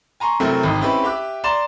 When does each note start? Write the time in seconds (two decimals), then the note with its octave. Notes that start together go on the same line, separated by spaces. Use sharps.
0.20 G#5 A#5 C6 C#6
0.40 C3 F#3 A3 C4 E4 A#4
0.63 G#1 G#2 D#6
0.81 C4 C#4 E4 G4 B4
1.04 G4 E5 D6 F#6
1.44 D5 A#5 C6 E7